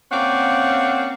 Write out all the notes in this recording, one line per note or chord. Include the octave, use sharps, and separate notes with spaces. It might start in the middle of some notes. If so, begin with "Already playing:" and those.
A#3 C4 C#4 D5 F5 F#5